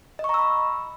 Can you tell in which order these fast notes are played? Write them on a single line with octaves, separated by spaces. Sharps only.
D#5 C#6 A#5 E6 B5